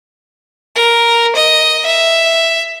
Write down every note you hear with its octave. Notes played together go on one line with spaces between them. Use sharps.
A#4
D#5
E5